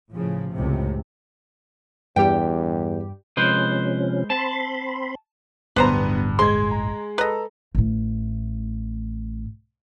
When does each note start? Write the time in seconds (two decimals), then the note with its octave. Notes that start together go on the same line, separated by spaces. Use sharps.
0.14 A2 C#3 F3
0.54 C#2 F#2 A2 C3
2.16 E2 G2 G3 G4 G5
3.37 C3 F3 G#3 C#4 B4 C5
4.30 C4 A5 B5 C6
5.76 D1 G1 G2 B2 B3 B4 C5 A#5
6.39 G#3 C6 G#6
6.71 A#5
7.18 A4 B4 D#5 A#5
7.75 A1 A2